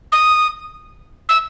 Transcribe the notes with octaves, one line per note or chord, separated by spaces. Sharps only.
D#6
E6